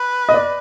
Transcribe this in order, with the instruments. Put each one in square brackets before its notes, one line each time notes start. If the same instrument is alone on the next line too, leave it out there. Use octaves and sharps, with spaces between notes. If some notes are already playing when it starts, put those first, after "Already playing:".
Already playing: [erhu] B4
[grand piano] D#5
D5